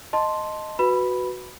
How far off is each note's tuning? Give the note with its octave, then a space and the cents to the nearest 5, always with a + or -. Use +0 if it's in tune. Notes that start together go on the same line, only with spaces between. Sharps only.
D#5 +0 A5 +0 C6 +5
F#4 -5 B4 +0 B5 +0